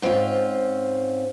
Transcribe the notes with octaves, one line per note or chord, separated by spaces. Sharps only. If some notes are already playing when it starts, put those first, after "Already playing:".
G#2 C4 C#4 E4 F4